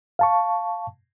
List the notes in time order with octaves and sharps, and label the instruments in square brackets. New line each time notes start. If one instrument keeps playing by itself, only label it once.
[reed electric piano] F5 A5 C#6